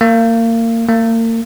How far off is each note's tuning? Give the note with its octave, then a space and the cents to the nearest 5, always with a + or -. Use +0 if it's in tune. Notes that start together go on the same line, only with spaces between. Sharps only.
A#3 -30
A#3 -40